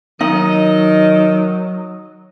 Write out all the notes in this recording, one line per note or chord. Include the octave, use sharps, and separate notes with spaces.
D#3 F#3 D#4 D#5